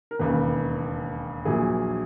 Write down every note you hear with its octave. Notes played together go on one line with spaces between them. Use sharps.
A#4
E1 D#2 C#3 B4
A#1 A#2 F#3 G#4